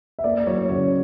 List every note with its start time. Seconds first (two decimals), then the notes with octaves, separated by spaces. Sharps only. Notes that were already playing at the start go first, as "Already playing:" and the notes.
0.19 E5
0.24 A#3 D5
0.47 F#3 C#5
0.69 C#3 C#5